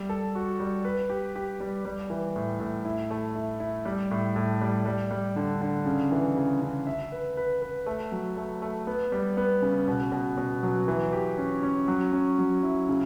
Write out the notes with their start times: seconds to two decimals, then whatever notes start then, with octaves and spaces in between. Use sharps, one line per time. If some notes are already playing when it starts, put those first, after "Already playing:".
Already playing: G3
0.09 A4
0.35 F#4
0.60 G3
0.85 B4
1.10 G4
1.36 G4
1.60 G3
1.85 G3
2.10 E3
2.36 A2
2.60 A2
2.85 E4
3.11 A3
3.36 E4
3.60 E4
3.85 G3
4.11 A2
4.36 A2
4.61 G3
4.86 G3
5.11 G3
5.36 D3
5.62 D3
5.86 C#3
6.11 E3
6.37 C#3
6.61 C#3
6.87 E5
7.12 B4
7.37 B4
7.62 B4
7.86 A3
8.12 F#3
8.37 A3
8.62 A3
8.87 B3
9.12 G3
9.37 B3
9.62 C#3
9.88 B2
10.12 B2
10.38 B2
10.63 F#3
10.88 E3
11.13 G4
11.38 C#4
11.63 C#4
11.88 F#3
12.13 C#4
12.38 F#3
12.63 E4
12.89 C#3